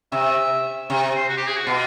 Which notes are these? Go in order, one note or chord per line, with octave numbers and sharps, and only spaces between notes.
C3 E5
C3
C5
F#4
G4
G#4
F#4
B2 F4